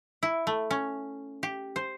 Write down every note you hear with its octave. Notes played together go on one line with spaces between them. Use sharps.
E4
A3
C#4
G4
C5